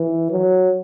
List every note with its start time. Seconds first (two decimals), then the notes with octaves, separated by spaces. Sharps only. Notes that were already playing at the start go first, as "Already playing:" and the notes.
Already playing: E3
0.32 F#3